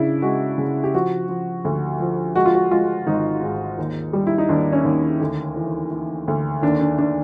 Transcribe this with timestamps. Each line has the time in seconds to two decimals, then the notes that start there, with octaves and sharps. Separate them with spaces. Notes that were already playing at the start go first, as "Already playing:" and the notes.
Already playing: C#3 D4 E4
0.22 G#3 F#4
0.58 C#3
0.84 G4
0.94 F3 F#4
1.29 F3
1.65 D2
2.00 F3
2.36 G#3 F#4
2.46 F4
2.55 F#4
2.71 G#3 F4
3.07 G#1 D#4
3.42 G#2
3.78 D#2
4.13 G3
4.27 E4
4.38 D#4
4.49 D#2 D4
4.73 C#4
4.85 D#2
5.21 D2
5.56 E3
5.91 E3
6.28 D2
6.62 D#2 D4
6.81 D4
6.98 D#2 D4